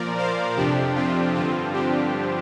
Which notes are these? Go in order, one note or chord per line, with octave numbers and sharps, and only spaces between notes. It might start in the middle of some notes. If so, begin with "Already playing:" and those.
Already playing: A#2 F3 A#4 D5
C5 F5
F2 C3 F3 D4 G4
C4 F4
G2 D3 F3 C4 F4
D4 G4